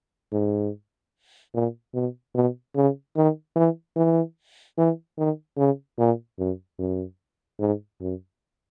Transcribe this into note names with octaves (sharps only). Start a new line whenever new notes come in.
G#2
A#2
B2
B2
C#3
D#3
E3
E3
E3
D#3
C#3
A#2
F#2
F#2
G#2
F#2